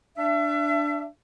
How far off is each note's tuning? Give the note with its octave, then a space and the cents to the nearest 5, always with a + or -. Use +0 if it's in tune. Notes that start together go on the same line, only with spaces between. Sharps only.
D4 +0 E5 +35